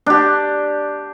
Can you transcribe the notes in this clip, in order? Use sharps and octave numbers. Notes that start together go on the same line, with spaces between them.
D4 G4